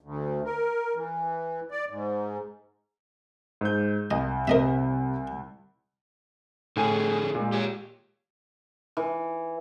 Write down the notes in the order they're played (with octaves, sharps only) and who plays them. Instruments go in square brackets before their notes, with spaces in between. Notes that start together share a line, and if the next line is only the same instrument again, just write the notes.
[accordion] D2
A#4
E3
D5
G#2
[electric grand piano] G#2 G6
[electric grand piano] C2 [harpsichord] D#5
[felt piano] C3 [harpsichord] A#4 D#5 E5
[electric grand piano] A2 G#5 D#7 [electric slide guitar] D3 G#4
[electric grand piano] A#2 G#3
[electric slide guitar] G4 C#5
[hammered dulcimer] E3